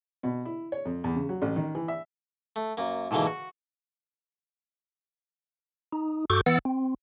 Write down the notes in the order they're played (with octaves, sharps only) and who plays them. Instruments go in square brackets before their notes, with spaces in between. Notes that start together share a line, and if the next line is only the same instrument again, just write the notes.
[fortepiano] B2
E4
C#5
F2
E2
C#3
F#3
A1
D#3
E3
E5
[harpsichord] A3
F#2 A#3
G#2 B2 D3 E3 A#3
F#4
[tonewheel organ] D#4
G2 F#4 A4 C#6 D6 G6
E3 B3 F#5 E6 A6
C4